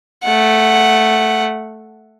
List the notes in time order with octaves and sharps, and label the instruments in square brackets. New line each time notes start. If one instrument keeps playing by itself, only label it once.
[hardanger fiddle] A3 F#5